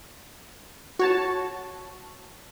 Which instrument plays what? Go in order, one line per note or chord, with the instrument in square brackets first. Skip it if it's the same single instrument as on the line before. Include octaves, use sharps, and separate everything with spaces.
[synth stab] F#4 C#5 A5